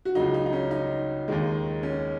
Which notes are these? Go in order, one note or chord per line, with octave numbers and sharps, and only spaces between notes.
F#4
C#2 C#3 F#3 D#4
D#4
D#4
C#4
D#4
D#2 D#3 G#3
C#4